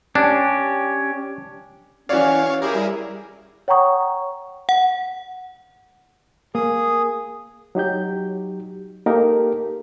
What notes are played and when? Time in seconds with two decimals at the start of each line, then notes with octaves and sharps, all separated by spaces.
0.15 C#4 D4 G4
2.09 E3 C#4 F#4 C#5 D5 F5
2.62 E4 G4 G#4 A#4
2.74 G3
3.68 C#5 F#5 G5 A#5 C#6 D#6
4.69 F#5
6.55 A#3 G#4 D#6
7.75 F#3 D#4 G4 G6
9.06 A#3 D#4 G4 A4 A#4